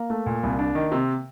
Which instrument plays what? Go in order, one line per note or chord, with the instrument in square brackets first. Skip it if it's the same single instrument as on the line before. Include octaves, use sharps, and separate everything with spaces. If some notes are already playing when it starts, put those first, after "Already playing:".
Already playing: [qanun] A#3
[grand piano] A3
A#2
C2
D4
D#3
C3